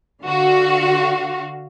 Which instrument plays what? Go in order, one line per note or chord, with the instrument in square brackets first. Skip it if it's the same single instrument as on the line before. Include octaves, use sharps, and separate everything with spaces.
[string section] D3 F#4 F5